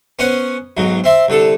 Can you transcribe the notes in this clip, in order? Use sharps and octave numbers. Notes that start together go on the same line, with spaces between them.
B3 C#4 C5 F#5
B1 G#2 F#3
C4 E5 C6
C2 D3 A4